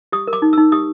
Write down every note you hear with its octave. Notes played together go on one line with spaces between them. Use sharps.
G4 D#6
A#4
D6
D#4
D#4 E6
G4 D#6